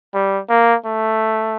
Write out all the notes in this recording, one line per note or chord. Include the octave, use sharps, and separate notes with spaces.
G3
A#3
A3